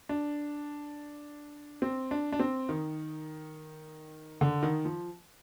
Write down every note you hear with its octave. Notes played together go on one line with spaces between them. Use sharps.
D4
C4
D4
D4
C4
D#3
D3
D#3
F3